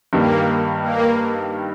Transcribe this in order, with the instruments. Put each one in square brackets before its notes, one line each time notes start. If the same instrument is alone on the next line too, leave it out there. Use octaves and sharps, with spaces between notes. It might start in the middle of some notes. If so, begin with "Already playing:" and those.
[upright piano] G2 D#3 G3 [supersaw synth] A#3
[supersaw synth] A#3